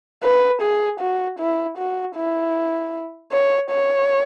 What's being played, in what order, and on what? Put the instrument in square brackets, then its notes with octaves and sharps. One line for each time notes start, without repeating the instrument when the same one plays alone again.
[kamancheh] B4
G#4
F#4
E4
F#4
E4
C#5
C#5